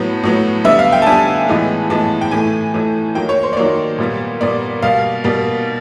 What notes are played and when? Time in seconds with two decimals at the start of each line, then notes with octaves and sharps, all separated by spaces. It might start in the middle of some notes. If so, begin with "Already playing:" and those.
Already playing: A2 F#3 B3
0.23 A2 F#3 B3
0.64 D3 G3 B3 E5
0.79 F5
0.92 G5
1.02 A5
1.06 D3 G3 B3 G#5
1.48 A2 E3 G#3 B3
1.90 A2 E3 G#3 B3 A5
2.21 G5
2.31 A2 E3 A3 G#5
2.73 A2 E3 A3
3.15 D#3 F#3 A#3 G5
3.29 C#5
3.43 C5
3.53 D5
3.57 D#3 F#3 A#3 C#5
3.98 A#2 G3 B3
4.41 A#2 G3 B3 D5
4.82 B2 G3 A#3 F5
5.24 B2 G3 A#3